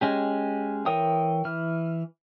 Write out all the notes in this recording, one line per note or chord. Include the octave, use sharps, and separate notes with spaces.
G#3 C#4 G4
E3 A#4 C#5 G5 D#6
E3 F6